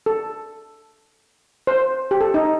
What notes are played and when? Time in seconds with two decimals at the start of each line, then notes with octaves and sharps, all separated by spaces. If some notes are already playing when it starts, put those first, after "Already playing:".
0.06 A4
1.67 C5
2.11 G4
2.21 A4
2.34 D#4